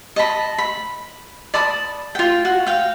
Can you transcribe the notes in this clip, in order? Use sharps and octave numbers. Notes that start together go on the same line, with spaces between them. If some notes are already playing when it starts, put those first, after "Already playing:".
D#5 A5 B5
B5
D5 A5 B5 D#6
F4 G5
F#4
F5 G5